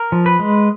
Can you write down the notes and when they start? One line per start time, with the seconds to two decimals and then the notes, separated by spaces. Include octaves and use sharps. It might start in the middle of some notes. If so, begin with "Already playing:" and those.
Already playing: A#4
0.12 F3
0.26 B4
0.39 G#3